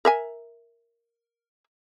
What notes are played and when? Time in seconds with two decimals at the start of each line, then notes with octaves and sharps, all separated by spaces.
0.05 A#4 E5 G#5